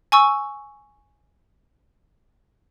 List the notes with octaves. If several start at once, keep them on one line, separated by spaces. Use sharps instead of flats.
G#5 C#6 E6